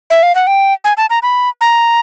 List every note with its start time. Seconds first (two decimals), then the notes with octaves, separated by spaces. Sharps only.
0.10 E5
0.23 F5
0.35 F#5
0.47 G5
0.84 G#5
0.97 A5
1.10 A#5
1.23 B5
1.61 A#5